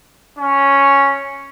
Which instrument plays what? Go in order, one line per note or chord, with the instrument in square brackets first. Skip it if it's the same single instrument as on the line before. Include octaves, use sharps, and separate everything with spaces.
[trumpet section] C#4